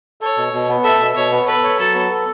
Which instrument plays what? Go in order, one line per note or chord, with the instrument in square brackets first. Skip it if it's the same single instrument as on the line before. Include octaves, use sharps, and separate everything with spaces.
[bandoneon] A4 [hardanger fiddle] C#5
[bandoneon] B2
B2
B3
[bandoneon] A4 [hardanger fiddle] E5
[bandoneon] B2
[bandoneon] B2 [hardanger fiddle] C#5
[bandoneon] B3
[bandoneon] A4 [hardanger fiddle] B4
[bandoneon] C#5
[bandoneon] F#3 [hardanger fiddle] A4
[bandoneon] B3
A4